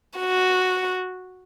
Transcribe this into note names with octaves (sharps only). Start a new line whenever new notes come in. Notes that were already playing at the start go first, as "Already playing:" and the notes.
F#4